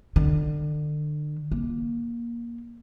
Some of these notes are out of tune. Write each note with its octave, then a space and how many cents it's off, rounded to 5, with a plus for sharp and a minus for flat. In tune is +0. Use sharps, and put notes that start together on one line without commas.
D3 +35
A#3 +15